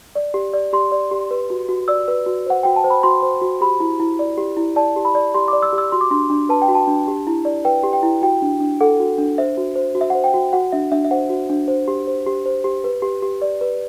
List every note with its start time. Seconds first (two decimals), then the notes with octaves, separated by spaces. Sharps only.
0.15 D5
0.34 G4
0.53 D5
0.73 G4 C6
0.92 D5
1.11 G4
1.31 B4
1.50 F#4
1.69 F#4
1.88 D5 E6
2.08 B4
2.26 F#4
2.47 C5 F#5
2.63 F#4 G5
2.76 A5
2.84 C5
2.90 B5
3.03 F#4 C6
3.22 C5
3.42 F#4
3.61 G4 B5
3.80 E4
4.00 E4
4.19 D5
4.38 G4
4.57 E4
4.76 D5 A5
4.96 G4
5.05 B5
5.15 D5
5.34 G4 C6
5.48 D5 D6
5.62 E6
5.73 G4
5.78 E6
5.92 F#4 C6
6.01 D6
6.11 D4 C6
6.30 D4
6.49 B4 A5
6.62 G5
6.68 F#4
6.75 A5
6.87 D4
7.08 G4
7.27 E4
7.45 D5
7.65 B4 G5
7.84 G4
7.93 G5
8.03 E4
8.22 F#4 G5
8.42 D4
8.60 D4
8.81 A4 F#5
9.00 F#4
9.18 D4
9.38 C5 E5
9.57 F#4
9.76 C5
9.95 F#4
10.01 E5
10.10 C5 F#5
10.24 G5
10.34 F#4
10.53 F#4 F#5
10.72 D4 E5
10.92 D4 E5
11.04 E5
11.11 C5 F#5
11.30 F#4
11.50 D4
11.68 C5
11.88 G4
12.07 C5
12.26 G4
12.46 C5
12.64 G4
12.84 B4
13.02 G4
13.22 G4
13.42 D5
13.61 B4